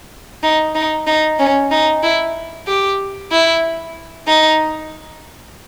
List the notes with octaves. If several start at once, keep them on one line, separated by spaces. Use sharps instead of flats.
D#4
D#4
D#4
C#4
D#4
E4
G4
E4
D#4